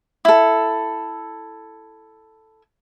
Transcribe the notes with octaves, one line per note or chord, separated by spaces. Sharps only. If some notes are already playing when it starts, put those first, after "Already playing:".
E4 A4